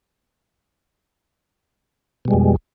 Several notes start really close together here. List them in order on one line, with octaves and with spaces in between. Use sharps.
B2 G3 G#3 F2